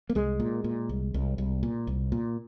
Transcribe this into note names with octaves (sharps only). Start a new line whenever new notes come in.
A#3
C2 G#3
A#2
A#2
C2
C2
C2
A#2
C2
A#2